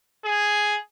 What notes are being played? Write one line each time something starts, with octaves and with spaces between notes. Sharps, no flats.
G#4